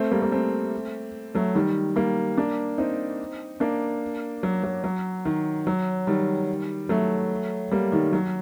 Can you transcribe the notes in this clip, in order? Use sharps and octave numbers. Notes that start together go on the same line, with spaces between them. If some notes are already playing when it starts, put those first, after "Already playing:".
Already playing: A3 C4
G3 A#3
A#3
A3 C4
F#3 A3
D#3 G3
G3 A#3
A#3 D4
C4 D#4
A#3 D4
F#3
F#3
F#3
D#3
F#3
D#3 G3
F#3 A3
G3 A#3
D#3 G3
F#3